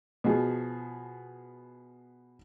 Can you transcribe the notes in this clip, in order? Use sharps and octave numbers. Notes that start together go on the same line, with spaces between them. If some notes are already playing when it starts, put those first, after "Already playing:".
B2 F3 G#4